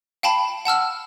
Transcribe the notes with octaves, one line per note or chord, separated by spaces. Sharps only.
F5 G5 A5 B5
F#5 A5 E6 F6